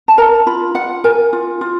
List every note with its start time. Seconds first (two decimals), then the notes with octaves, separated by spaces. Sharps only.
0.08 A5
0.18 A#4 A#5
0.47 F4 B5
0.75 F4 F#5
1.04 A#4 G#5
1.33 F4
1.61 F4